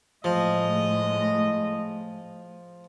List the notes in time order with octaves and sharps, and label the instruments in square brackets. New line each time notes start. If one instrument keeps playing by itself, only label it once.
[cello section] A2 [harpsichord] F3 [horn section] G#3 D#5